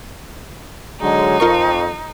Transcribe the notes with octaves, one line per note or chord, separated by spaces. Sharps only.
D3 F#3 G#3 D#4
F2 F4 A#4 C#6